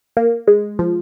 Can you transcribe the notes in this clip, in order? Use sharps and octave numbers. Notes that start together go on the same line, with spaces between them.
A#3
G#3
F3